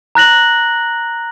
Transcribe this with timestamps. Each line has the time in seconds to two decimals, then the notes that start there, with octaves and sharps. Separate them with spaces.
0.15 A#5 F#6 A#6 F#7